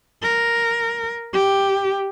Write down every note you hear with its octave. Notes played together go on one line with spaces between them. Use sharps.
A#4
G4